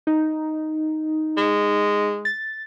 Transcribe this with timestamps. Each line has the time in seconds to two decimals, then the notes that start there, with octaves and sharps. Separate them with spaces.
0.07 D#4
1.37 G#3
2.25 A6